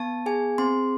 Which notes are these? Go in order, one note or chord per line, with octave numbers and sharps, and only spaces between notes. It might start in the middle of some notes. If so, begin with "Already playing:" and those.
Already playing: B3 A5
G#4 G#5
C4 C6